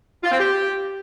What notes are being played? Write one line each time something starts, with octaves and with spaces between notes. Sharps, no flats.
F4
C4
G4